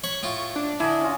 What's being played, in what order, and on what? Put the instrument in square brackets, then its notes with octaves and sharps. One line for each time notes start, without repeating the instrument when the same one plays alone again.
[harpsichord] C#5 B5 [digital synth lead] C#6
[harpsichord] A2 F4 [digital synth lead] C#6
[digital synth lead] D4
[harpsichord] D3 [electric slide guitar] E4 [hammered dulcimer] D#5 G#5
[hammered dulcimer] C#4 F4